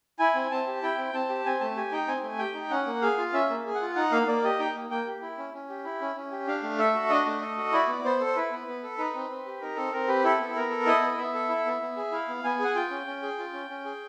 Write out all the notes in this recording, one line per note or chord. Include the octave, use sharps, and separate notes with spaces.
E4 G#5
C4
C4 A5
G4
E4 G5
C4
C4 A5
G4
C4 G#5
A3 A5
G4 G#5
D#4 G5
C4 G#5
A3
G4 G5
D#4
C#4 F#5
A#3
G#4 F5
F4
C#4 E5
A#3
G#4
F#5
F4
D#4 F#5
A#3 F5
A#3 D5
G4 D#5
D#4 G5
A#3
A#3 G5
G4
E4
C#4
C#4
G4
E4
C#4
C#4
G4
D4 F5
A3
A4 E5
F#4
D4 D#5
A3
A4
F#4
E4 D5
B3
B3 C5
A4
C5
E4 B4
B3
B3
A4
D#4 B4
C4
C4
G4
D#4 A#4
C4 A4
C4 A#4
G4 B4
E4 A4
B3
B3 A#4
A4
E4 D#5
B3
B3 E5
A4
E4
B3
B3
G#4
E4 F5
B3
B3 G#5
G#4 F#5
F4 G5
C#4
C#4
G#4
F4
C#4
C#4
G#4